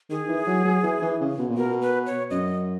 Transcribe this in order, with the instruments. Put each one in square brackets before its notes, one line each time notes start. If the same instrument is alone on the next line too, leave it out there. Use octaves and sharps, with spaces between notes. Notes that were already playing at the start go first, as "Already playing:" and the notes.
[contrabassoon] D#3 [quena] G#4
[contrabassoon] E3
F#3
F#3
E3
E3
C#3
B2
A#2
[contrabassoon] B2 [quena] A#4
[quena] B4
C#5
[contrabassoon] F#2 [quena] D#5